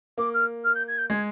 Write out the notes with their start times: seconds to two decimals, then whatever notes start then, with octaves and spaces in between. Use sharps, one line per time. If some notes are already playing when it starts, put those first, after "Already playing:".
0.18 A#3 D6
0.34 F6
0.64 F6
0.75 G6
0.87 G#6
0.98 G6
1.09 G#3 G#6